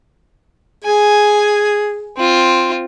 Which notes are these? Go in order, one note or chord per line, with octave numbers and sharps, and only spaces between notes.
G#4 G#5
C4 F4